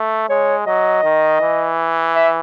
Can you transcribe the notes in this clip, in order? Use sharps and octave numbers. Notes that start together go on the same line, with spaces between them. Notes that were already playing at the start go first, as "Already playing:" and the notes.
Already playing: A3
G#3 C#5
F#3 D#5
D#3
E3
E5